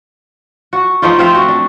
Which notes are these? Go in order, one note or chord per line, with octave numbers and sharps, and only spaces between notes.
F#4
F3 A3 D#4 F4
C4 F4 E5 F5
F#4
D4